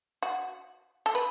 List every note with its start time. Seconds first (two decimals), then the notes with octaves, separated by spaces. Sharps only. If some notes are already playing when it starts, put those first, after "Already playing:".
0.22 F#4
1.06 A4
1.15 B4